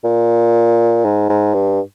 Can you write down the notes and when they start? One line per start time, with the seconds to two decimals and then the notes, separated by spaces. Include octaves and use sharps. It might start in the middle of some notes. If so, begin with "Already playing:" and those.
0.04 A#2
1.05 G#2
1.29 G#2
1.54 G2